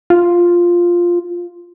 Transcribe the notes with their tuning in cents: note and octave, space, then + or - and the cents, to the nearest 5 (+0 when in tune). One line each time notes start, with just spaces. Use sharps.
F4 +0